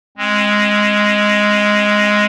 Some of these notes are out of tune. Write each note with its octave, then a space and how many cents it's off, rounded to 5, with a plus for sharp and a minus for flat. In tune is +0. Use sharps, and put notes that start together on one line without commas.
G#3 +0 C4 +40